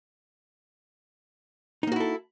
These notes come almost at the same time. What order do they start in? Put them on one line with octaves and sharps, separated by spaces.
D#4 A#3 F#4 E4 A4